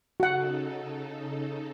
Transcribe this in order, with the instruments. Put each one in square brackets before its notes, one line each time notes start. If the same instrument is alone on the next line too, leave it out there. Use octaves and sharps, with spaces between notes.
[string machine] C#3 D#4 A4 [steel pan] F#4 F#5